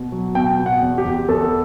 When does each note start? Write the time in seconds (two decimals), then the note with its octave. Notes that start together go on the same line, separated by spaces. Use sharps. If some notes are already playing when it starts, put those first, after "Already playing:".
Already playing: B2
0.12 F#3
0.35 B2 G5
0.59 B2
0.66 F#5
0.81 E2
0.98 G4
1.05 E2
1.28 E2 A4